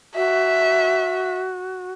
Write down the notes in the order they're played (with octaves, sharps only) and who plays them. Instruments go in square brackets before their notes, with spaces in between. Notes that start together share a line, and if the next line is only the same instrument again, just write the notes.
[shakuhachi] F#4 [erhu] E5